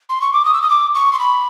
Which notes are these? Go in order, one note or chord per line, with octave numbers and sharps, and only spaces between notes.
C6
C#6
D6
D#6
E6
D#6
D6
C#6
C6
B5